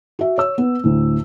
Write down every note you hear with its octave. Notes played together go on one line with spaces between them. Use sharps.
F#4 E5
C#5 E6
B3
D2 A2